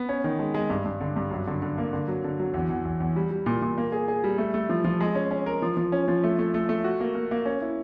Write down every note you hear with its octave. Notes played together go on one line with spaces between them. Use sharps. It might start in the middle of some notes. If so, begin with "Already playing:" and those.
Already playing: B3
C#4
D#3
G#3
G#3
G2
G2
D3
G2
F#2
D3
D3
A#3
D3
F#3
D3
F#3
E2
E2
E2
E2
G3
G3
A#2
A#2
A#3
G#4
G#4
G3
A3
A3
F3
F3
G#3
C#4
C#4
A#4
F3
F3
C#4
F3
A3
A3
A3
A3
F#4
A#3
A#3
A#3
C#4
E4